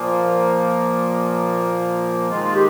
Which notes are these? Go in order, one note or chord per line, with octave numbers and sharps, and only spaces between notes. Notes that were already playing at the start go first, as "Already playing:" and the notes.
Already playing: A#2 F3 A#3
D#3 G#3 F4
G4